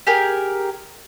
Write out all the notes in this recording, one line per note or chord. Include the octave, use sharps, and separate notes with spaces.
G4 G#4 A#4